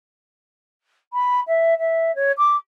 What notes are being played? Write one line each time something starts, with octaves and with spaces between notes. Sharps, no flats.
B5
E5
E5
C#5
D6